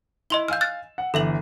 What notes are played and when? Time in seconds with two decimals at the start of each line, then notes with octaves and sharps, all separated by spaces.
0.30 E4 D#5 C6 G7
0.48 F5 G#5 E6 F6 G6
0.61 F6 F#6 A6
0.98 F#5
1.14 G1 E3 A4 E5 F#7